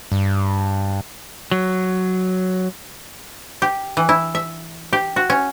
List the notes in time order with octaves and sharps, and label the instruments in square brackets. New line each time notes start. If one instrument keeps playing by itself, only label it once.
[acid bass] G2
[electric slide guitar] F#3
[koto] G4
E3
E4
E5
G4
F#4
C#4